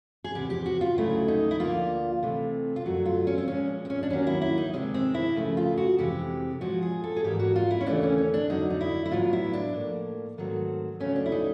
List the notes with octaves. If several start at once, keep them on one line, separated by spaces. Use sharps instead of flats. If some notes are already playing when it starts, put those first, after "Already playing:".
G#4
E2 C3 F3 G4
G4
F#4
F4
D2 C#3 F#3 A3 C4 E4
D#4
E4
D2 D3 F3 A#3 F4
C3 E3 A3 C4
F4
F#2 D3 F#3 A3 F#4
F4
C#4
C4
A#2 F3 G#3 C#4
C4
C#4
D4
D#2 D#3 F#3 A#3 C#4
E4
E4
D#4
C3 D#3 G#3 C4 C#4
C4
E4
D#2 C#3 F3 A3
F4
F#4
F2 C3 E3 G#3 C4 G4
A#2 F3 G#3 F#4
G#4
A4
G#4
G#2 E3 G3 A#3 G4
F#4
F4
E4
C#4
D#2 C#3 E3 A3 D4
C#4
C#4
D4
F2 D3 F#3 D#4
D#4
E4
E4
A2 F#3 B3 F4
E4
D4
A2 F3 A#3
G#2 D#3 F#3 A3 C4
D2 C#3 F#3 A3 C#4
D4
E4
D#4